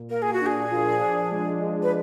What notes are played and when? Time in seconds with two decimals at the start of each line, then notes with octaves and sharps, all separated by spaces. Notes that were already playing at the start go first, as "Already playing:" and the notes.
Already playing: A#2
0.10 A#3 A#4
0.22 G#4
0.33 F#4
0.41 D4
0.46 G#4
0.71 F3
1.01 D4
1.31 G#3
1.61 G#3
1.82 B4